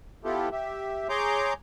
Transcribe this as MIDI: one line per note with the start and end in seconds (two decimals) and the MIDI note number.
0.25 0.49 59
0.25 0.49 64
0.25 0.49 65
0.25 0.49 67
0.25 0.49 69
0.52 1.07 67
0.52 1.07 76
1.09 1.53 68
1.09 1.53 73
1.09 1.53 82
1.09 1.53 84
1.09 1.53 86
1.09 1.53 91